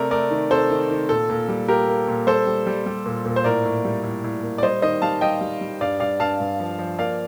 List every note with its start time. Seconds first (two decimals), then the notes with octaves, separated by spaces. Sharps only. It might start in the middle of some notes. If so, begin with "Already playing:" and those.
Already playing: C3 A3 A#4 D5
0.11 A3 A#4 D5
0.31 D#3
0.51 C3 A4 C5
0.70 D#3
0.90 D#3
1.09 A#2 A4
1.30 A#2
1.48 G3
1.68 A#3 G4 A#4
1.88 A#3
2.08 A#2
2.27 G3 A4 C5
2.47 G3
2.67 G3
2.86 G3
3.06 A#2
3.25 A#2
3.36 C5
3.44 A2 A#4 D5
3.65 A2
3.84 G3
4.03 A2
4.24 A2
4.43 A#3
4.58 D5
4.63 G3 C5 D#5
4.82 D#3 C5 D#5
5.02 G3 F5 A5
5.21 G3 D#5 G5
5.41 G3
5.61 G3
5.81 G2 D5 F5
6.00 G2 D5 F5
6.20 G2 F5 A5
6.40 G2
6.60 F3
6.79 F3
6.98 A#3 D5 F5